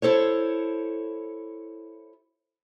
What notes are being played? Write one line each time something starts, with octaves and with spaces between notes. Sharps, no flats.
E4 A4 C5 C#5